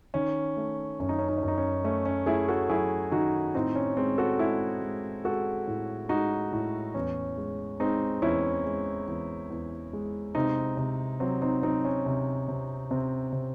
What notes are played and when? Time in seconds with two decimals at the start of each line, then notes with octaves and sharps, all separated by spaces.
0.14 D#3 C#4
0.57 A3
0.99 F#2 C#4
1.09 D#4
1.18 C#4
1.29 D#4
1.38 F#2 C#4
1.48 D#4
1.57 C#4
1.84 A3 C#4
2.06 C#4
2.26 A3 E4 G#4
2.48 F#4 A4
2.69 F#3 E4 G#4
3.11 D#3 D#4 F#4
3.55 A2 C4 D#4
3.76 C#4
3.97 G#3 C4
4.18 F#4 A4
4.39 G#3 E4 G#4
4.82 G#3
5.24 G#3 F#4 A4
5.67 A2
6.09 G#3 D#4 F#4
6.53 A2
6.94 E2 C#4
7.37 G#3
7.80 G#3 C4 D#4
8.22 E2 C#4 E4
8.65 G#3
9.08 E2
9.50 E2
9.93 G#3
10.35 C3 C4 D#4
10.77 C3
11.20 F#3 C4
11.42 C4 D#4
11.62 F#3 C4 D#4
11.85 C#4
12.06 C3
12.48 C3
12.91 C3 C4
13.33 C3